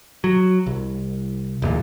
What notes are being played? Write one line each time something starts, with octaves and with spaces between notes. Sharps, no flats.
F#3
C2
D1 E2 A#2